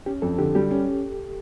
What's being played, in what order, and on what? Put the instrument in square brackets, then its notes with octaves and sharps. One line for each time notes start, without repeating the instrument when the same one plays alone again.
[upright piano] C#4 [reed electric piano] G4
[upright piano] F2 [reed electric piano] A4
[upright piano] D3 [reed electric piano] G4
[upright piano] G3 [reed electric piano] G4
[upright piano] C#4